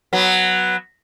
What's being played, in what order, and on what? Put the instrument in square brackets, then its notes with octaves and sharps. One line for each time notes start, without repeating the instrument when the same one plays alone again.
[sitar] F#3 B3